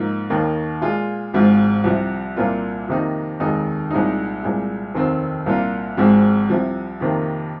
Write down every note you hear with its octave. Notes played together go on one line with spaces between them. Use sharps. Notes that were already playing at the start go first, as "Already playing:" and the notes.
Already playing: G#2 F3 A#3 D#4
D#2 D#3 A#3 D#4
A#2 G#3 F4
G#1 G#2 F3 G#3 F4
C2 C3 F3
C2 A#2 A#3 F4
F2 C3 D#3 A#3 D#4
F1 D#2 D#3 G#3 D#4
C2 A#2 G#3 D#4
C2 A#2 G#3
F1 D#2 D#3 C4
C2 A#2 A#3 F4
G#1 G#2 F3 G#3 C4
C2 C3 F3
F2 C3 D#3 A#3